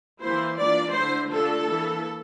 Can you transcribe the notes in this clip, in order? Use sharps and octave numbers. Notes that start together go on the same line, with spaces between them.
E3 A#3 E4 C5
E3 A#3 D4 F4 D5
D3 A3 E4 C5
D3 A3 D4 F4 A4
E3 A#3 E4